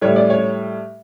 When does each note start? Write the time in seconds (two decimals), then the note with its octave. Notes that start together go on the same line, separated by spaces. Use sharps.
0.01 A2 G3 C#5
0.16 D5
0.30 C#5